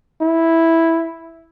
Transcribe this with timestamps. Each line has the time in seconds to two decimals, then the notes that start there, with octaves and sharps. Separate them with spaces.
0.21 E4